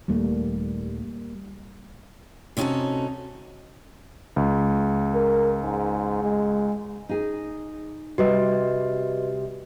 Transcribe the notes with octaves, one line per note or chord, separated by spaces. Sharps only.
D#1 D#2 G3 A3 A#3
C3 B3 C#4 D#4 F#4 A4
C#2
A#4
G#2
G#3
D#4 G#4
C3 G3 F#4 B4 D#5